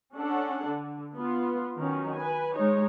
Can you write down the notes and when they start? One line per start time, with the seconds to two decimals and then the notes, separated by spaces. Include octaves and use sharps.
0.14 C#4 D4 A4 F#5
0.67 D3
1.15 B3 F4
1.77 D#3 F#3 C#4
2.14 B4 G#5
2.56 G#3 D#4 C#5